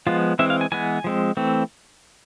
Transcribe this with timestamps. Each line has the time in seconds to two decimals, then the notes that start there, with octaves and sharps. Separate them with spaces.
0.07 F3 G#3 B3 F4
0.39 E3 G#3 C4 E5
0.50 F5
0.61 G#5
0.72 E3 G#3 B3 G#5
1.04 F3 G#3 C4
1.37 E3 A3 C4